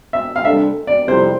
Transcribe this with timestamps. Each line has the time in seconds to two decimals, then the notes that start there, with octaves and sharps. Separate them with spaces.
0.13 E5
0.36 F5
0.44 C3 G3 D4 A4 E5
0.87 D5
1.07 F2 C3 G3 C4 E4 C5